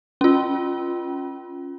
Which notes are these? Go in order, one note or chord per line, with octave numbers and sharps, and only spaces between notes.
C#4 F4